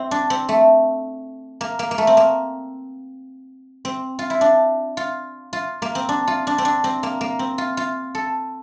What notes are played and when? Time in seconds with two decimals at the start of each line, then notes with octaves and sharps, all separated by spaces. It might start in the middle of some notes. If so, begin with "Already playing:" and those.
Already playing: C4 E4
0.11 D4
0.30 C4
0.49 A3
1.61 A#3
1.79 A#3
1.91 A#3
1.98 A3
2.07 C4
2.17 A#3
3.85 C4
4.19 F4
4.30 E4
4.41 D4
4.97 F4
5.53 F4
5.82 A#3
5.95 C4
6.09 D4
6.28 F4
6.47 D4
6.58 C4
6.65 D4
6.84 C4
7.03 A#3
7.21 A#3
7.39 C4
7.58 F4
7.77 F4
8.15 A4